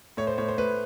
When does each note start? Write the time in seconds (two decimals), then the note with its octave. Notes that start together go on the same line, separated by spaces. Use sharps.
0.17 A2 C#5
0.27 C5
0.38 A2 C#5
0.48 C5
0.58 A2 B4